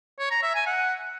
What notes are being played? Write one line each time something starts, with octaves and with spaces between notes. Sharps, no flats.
C#5
A#5
E5
G#5
F#5